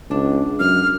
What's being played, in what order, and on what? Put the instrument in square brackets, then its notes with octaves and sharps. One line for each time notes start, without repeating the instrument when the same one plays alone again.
[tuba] C#2 [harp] D4
[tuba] F#2 [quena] F6